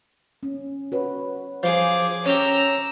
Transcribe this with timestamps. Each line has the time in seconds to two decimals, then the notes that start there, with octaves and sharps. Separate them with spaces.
0.43 C#4
0.92 F#4 B4 C#5
1.63 F3 G#4 D6
2.26 C#4 G4 A#5 E6